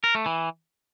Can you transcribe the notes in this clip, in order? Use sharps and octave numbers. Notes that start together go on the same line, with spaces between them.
A#4
A3
E3